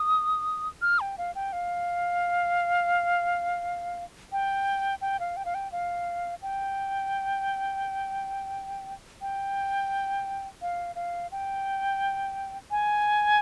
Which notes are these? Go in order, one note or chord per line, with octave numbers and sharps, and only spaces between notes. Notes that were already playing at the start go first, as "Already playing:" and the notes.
Already playing: D#6
F6
G5
F5
G5
F5
G5
G5
F5
G5
F5
G5
F5
G5
G5
F5
F5
G5
G#5